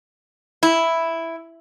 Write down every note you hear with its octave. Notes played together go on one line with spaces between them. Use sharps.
E4